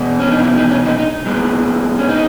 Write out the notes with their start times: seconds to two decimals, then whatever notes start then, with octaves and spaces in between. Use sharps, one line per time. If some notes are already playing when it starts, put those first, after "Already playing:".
Already playing: E2 B2 G#3 B3
0.19 C#4
0.32 D#4
0.44 E4
0.57 D#4
0.71 C#4
0.85 D#4
0.99 D#4
1.26 A2 G#3 B3
1.99 C#4
2.09 D#4